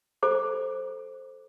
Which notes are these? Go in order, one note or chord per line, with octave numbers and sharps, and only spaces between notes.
A4 C5 D6